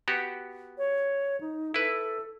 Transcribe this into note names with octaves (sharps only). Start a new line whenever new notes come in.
B3 F#4 G4
C#5
D#4
E4 A4 B4